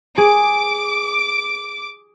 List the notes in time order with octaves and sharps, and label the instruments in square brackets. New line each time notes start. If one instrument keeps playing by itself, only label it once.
[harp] G#4 [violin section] D6 D7